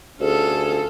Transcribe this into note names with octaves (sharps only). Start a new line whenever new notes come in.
D2 C#4 F4 G#4 A4